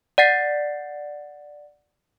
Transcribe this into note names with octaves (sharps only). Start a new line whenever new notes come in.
D5 F#5 A6 C7